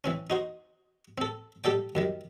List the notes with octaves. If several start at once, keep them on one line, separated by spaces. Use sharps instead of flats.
E3 C4 C#4
D#4 F#4 C5
C4 A4
G3 G4 A4 D5 G5
F#2 D#3 G3